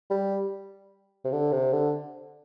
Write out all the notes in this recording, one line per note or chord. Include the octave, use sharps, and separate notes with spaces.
G3
C3
D3
C3
D3